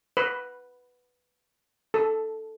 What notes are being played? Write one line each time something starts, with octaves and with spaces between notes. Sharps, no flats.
B4
A4